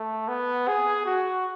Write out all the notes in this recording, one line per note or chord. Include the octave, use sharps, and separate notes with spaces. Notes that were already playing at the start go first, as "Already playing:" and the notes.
Already playing: A3
B3
G#4
F#4